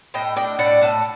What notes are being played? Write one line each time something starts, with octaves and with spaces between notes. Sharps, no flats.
A2 D#5 G5
D4 D#5 G5
A2 D5 F#5
A2 F#5 A5